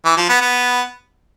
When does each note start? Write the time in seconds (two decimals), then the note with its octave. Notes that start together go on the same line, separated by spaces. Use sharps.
0.05 E3
0.17 F3
0.29 B3
0.41 B3